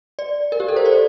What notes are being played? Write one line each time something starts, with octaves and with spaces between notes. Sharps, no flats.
D5
A#4
G4
A4
C5
D5